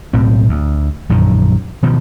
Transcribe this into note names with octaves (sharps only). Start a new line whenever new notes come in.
B1 A2 C4
D2
A#1 F#2 D3 D#3
B2 D#3 F3